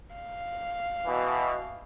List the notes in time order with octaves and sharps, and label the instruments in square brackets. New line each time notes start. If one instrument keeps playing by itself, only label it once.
[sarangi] F5
[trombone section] B2 E3